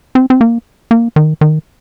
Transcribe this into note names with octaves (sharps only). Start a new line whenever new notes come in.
C4
C4
A#3
A#3
D#3
D#3